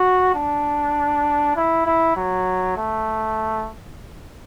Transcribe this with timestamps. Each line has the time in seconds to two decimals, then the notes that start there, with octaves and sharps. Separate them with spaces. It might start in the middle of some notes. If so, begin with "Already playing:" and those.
Already playing: F#4
0.35 D4
1.56 E4
1.86 E4
2.16 F#3
2.77 A3